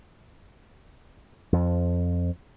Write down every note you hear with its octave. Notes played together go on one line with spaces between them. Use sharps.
F2 F3